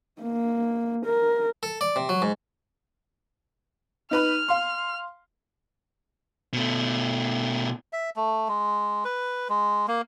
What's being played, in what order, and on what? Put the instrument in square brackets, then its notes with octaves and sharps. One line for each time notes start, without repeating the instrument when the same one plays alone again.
[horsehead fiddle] A#3
A#4
[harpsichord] A4
D5
C3
F#3
G#2
[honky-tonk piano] D#4 B4 B5 [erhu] F6
[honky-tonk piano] F5 C6
[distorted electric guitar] B2 A3
[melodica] E5
A3
G#3
B4
G#3
A#3